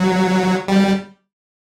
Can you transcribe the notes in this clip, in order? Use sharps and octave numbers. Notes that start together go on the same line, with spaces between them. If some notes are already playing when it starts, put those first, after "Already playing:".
Already playing: F#3
G3